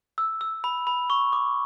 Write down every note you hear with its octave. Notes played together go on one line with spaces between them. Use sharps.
E6
E6
B5
B5
C#6
D6